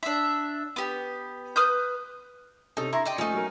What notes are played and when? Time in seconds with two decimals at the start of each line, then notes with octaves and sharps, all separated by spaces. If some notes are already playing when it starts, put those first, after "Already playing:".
0.03 D4 E5
0.76 B3 G4
1.56 B4 D#6 F6 G6
2.77 C3 C#4 D#4 A4
2.93 E4 A#5 C6 A#6
3.05 D5 D#5 G5
3.18 F3 A3 C#4 D#4
3.34 F#3 A#4